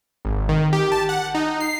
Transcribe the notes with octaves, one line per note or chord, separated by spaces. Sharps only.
G#1
D#3
G4
A5
F#5
D#4
C7